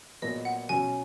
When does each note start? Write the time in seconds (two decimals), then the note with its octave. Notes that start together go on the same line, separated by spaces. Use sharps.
0.22 A#2 F#3 B3 D#5
0.45 F#5
0.69 B2 F#3 C#4 G#5